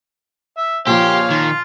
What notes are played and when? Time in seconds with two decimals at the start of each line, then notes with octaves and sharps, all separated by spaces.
0.58 E5
0.87 A#2 F3 G4 C#5 F5 C6
1.30 D#3 F4